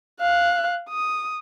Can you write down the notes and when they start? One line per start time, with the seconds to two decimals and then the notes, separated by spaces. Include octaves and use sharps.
0.21 F5 F#6
0.89 D#6